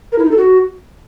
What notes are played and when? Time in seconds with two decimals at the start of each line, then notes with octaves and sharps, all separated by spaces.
0.12 A#4
0.18 E4
0.25 D#4
0.31 A4
0.37 F#4